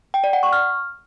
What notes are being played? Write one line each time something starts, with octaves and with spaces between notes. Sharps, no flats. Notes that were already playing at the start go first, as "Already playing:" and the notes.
G5
D5
F#5
C#6
F6